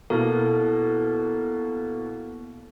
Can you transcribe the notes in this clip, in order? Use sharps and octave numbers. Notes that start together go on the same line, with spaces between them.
B2 A#3 E4 A4